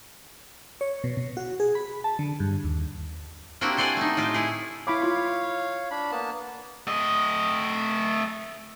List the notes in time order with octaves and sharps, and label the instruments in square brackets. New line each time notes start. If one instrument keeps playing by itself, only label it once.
[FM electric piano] C#5
B2
B2
F#4
G#4
B5
A5
D3
G2
D#2
[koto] A#3 C4 D4 E4 F#4 G4
A4 C5 D5 F#5 G#5
A3 D#4
A2 F4 G4
E4 G#4
[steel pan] E4 B5 D6 [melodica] C#5 F5
[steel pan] F4 C6
[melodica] D4 B5
A#3 B3 A5
[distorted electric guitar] A3 D#5